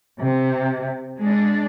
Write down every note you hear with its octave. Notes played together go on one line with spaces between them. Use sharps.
C3
G#3 D4